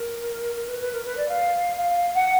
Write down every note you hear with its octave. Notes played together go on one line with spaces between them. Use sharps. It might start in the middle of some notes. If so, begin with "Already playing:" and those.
Already playing: A#4
A#4
B4
B4
A#4
B4
D5
F5
F5
F#5